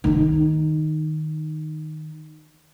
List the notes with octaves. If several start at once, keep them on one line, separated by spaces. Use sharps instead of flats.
D#3 D#4